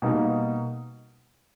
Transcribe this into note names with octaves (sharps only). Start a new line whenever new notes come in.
B2 G3 A#3 D#4